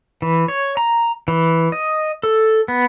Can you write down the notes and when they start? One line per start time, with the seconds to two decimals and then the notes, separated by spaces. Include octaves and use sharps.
0.22 E3
0.48 C#5
0.77 A#5
1.28 E3
1.72 D#5
2.23 A4
2.68 B3